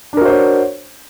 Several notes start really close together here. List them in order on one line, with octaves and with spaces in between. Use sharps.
D4 A#4 F#4 C5 C#5